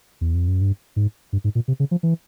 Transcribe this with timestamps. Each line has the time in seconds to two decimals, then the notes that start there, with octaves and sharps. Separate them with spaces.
0.21 E2
0.34 F2
0.48 F#2
0.61 G2
0.96 G#2
1.33 G2
1.44 G#2
1.55 A#2
1.68 C3
1.80 C#3
1.91 F3
2.03 E3